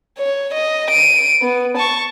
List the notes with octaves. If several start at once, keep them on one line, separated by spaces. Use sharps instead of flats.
C#5
D#5
D7 D#7
B3
A5 C#6